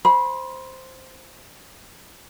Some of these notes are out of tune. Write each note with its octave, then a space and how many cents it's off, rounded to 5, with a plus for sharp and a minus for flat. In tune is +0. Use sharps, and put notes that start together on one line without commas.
C5 +0 B5 -30